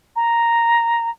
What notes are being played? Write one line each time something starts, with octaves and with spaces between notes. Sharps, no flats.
A#5